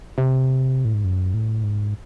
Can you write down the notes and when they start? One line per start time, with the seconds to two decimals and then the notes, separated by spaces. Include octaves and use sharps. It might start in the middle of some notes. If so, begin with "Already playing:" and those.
0.18 C3
0.85 A2
0.94 G#2
1.04 F#2
1.34 A2
1.63 G#2